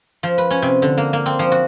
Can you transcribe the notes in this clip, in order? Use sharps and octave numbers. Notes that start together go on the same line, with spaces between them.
F3
B4
C#4
C3
D3
A#3
A#3
C4
F3
F#4